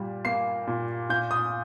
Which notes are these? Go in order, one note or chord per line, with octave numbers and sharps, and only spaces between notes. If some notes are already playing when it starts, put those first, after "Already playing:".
Already playing: A#2 G3
A#3 C7
A#2
A#2 G6
D#6